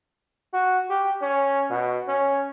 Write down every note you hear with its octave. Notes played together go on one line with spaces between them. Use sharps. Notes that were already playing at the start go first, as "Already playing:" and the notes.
F#4
G4
C#4
B2
C#4